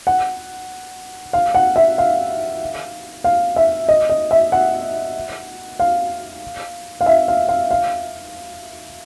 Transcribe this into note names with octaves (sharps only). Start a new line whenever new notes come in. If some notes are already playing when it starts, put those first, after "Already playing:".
F#5
F5
F#5
E5
F5
F5
E5
D#5
D#5
E5
F#5
F5
F5
E5
F5
F5
F5